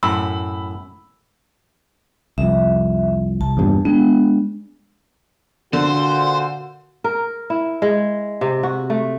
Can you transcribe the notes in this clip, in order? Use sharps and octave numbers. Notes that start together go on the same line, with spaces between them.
F#2 A2 B5 E6
C2 F2 E5
C2 A5
E2 G2 A#2
G#3 B3 D4
A#2 D3 F#4 C5
A#4
E4
G#3
C3
F#4
A3